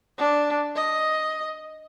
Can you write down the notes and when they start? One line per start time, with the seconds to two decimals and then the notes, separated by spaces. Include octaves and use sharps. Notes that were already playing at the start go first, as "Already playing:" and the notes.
0.18 D4
0.75 D#5